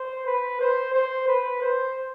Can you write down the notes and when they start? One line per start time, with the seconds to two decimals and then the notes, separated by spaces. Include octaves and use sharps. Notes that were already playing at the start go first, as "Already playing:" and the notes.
Already playing: C5
0.27 B4
0.61 C5
0.94 C5
1.28 B4
1.62 C5